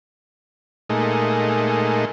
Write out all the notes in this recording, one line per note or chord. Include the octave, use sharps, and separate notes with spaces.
A#2 G#3 A3 D#4